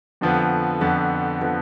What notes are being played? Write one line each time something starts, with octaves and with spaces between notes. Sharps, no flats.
F2 D3 F3 B3
F2 D3 F3 B3
D3 F3 B3